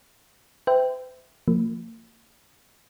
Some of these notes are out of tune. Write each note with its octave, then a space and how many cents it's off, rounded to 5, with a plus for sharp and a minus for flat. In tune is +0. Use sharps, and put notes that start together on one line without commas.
C5 -45 E5 +0 G5 +0
F3 +0 A#3 -40